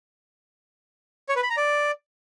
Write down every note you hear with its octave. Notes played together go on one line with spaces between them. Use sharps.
C#5
B4
B5
A#5
D5